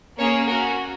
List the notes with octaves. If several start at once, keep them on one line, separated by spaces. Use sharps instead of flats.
A#3 C#4 G#4 C#5
C#4 F#4 A#4